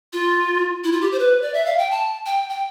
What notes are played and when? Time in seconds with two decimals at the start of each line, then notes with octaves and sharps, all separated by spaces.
0.13 F4
0.84 E4
0.92 F4
1.01 G4
1.12 C5
1.19 B4
1.42 D5
1.54 E5
1.66 F5
1.78 G5
1.91 A5
2.26 G5
2.50 G5